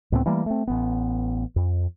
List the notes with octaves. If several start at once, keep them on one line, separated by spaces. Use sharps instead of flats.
C#2 A2 B3 C4
E3 G3 A3 A#3
A3 C4
A1 B3
F2